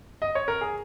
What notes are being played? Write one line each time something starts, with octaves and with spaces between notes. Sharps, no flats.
D#5
C#5
A#4
G#4